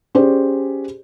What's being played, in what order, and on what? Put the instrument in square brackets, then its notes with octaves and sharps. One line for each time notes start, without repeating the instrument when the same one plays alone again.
[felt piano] C#4 G4 G#4 C5 D5